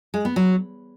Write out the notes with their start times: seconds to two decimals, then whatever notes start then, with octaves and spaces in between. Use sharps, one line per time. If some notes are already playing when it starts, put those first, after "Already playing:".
0.14 G#3
0.25 B3
0.36 F#3